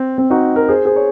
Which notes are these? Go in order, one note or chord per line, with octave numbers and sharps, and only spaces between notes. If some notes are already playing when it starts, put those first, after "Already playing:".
Already playing: C4
C4
D#4 F#4
F#4 A#4
G#4 C5
G#4 C5
C#5